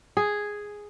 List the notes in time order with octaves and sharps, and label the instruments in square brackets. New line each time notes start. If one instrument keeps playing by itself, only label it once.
[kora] G#4